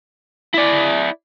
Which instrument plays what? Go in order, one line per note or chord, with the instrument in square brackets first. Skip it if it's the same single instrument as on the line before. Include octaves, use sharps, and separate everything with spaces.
[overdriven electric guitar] E4 D5